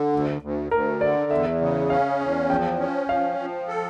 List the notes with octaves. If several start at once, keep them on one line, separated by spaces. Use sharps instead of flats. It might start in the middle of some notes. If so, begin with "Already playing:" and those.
Already playing: D3
D2
D2
D2 A#4
D3 D5
E2 E5
C#3
C#4 F5
E2
F3 G5
C#4
F3 F5
F3
A4